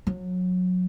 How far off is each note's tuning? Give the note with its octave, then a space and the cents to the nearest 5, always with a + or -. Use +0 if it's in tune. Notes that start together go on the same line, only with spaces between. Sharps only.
F#3 -25